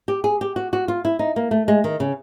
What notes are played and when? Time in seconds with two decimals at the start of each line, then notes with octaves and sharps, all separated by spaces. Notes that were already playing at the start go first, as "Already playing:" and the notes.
0.08 G4
0.24 G#4
0.41 G4
0.56 F#4
0.73 F#4
0.88 F4
1.05 E4
1.19 D#4
1.36 A#3
1.51 A3
1.68 G#3
1.84 D#3
2.00 C#3